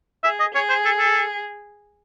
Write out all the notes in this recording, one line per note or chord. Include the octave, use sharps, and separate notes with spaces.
G#4 E5
D#5
G#4 C#5
C5
A4
A4